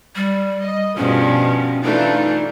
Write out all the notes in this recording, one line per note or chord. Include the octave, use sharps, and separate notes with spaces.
G3
D#5
G2 B2 F3 C#4 G#4
E3 A3 D4 D#4 F4